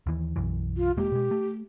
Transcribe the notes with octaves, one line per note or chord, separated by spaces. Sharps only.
D#2 E3
B1 F#2 E3
F4
E1 G#3 A#3 G4
B2 G#3
A3